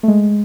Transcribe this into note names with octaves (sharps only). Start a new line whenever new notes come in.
A3
G#3